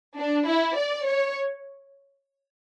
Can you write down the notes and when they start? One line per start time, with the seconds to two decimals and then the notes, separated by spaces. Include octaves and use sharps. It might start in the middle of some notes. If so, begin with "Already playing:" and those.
0.17 D4
0.47 E4
0.76 D5
1.06 C#5